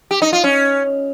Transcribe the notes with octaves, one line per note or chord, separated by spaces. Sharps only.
G4
D#4
F4
C#4